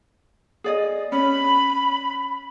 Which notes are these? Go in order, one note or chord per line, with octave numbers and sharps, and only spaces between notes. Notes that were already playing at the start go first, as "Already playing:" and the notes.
G#4 D5 D#5
C#4 B5